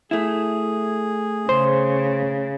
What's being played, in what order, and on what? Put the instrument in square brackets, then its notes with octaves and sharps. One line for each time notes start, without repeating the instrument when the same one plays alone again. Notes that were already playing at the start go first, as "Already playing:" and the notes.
[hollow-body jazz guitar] A3 E4 [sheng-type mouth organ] G#4
[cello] C#3 [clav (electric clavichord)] C5